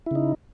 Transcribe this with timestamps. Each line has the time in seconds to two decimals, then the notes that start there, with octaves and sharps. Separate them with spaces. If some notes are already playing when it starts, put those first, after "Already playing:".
0.06 E4
0.11 C#3
0.15 D#4